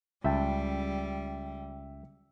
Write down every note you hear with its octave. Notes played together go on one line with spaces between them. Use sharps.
C#2 G3 E5 G5 A5